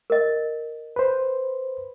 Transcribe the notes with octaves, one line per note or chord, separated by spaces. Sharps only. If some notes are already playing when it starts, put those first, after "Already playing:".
A#4 D#5
B4 C5